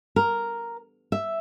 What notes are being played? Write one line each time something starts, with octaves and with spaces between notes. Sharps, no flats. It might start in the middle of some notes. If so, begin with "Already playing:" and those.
A#4
E5